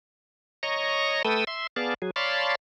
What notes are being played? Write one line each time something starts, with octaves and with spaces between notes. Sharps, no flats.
C#5 D#5 A#5 C#6
A3 A4 B4 G5 D#6 E6
E5 C6
B3 G#4 D5 F5 A5
F#3 G#4
C#5 D5 F5 A5 B5 C6